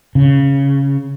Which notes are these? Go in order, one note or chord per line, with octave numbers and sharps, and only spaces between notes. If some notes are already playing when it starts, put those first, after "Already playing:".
C#3